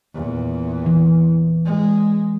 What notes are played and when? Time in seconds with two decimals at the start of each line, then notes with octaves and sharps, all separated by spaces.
0.15 E2 A#2
0.86 E3
1.65 G#3